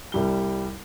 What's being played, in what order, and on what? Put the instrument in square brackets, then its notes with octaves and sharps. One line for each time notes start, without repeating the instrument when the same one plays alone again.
[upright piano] C2 G3 G7